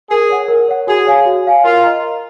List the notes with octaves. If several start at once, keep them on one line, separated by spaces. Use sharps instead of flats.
G#4 A#4
C#5 F#5
A#4
C#5 F#5
F#4 G#4
C#5 F5 G#5
F#4
C#5 F5 G#5
F4 A#4
D#5 A#5
A#4